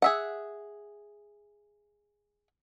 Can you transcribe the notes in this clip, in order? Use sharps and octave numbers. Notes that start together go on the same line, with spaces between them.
G#4 E5 F#5